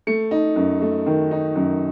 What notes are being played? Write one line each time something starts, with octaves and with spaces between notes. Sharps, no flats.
A3 C#7
D#4
F#2
A3
D#3
D#4
F#2